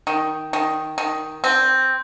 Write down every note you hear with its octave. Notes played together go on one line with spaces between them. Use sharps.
D#3
D#3
D#3
C4